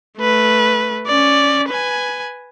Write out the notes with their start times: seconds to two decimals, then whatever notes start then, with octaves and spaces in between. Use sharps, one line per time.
0.18 A3 B4
1.07 C#4 D5
1.69 B4 G#5